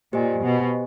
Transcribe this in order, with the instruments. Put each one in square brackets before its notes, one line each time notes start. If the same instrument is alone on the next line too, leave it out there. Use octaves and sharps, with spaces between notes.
[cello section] A#2 [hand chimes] G4 C5 D#5 G#5
[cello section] B2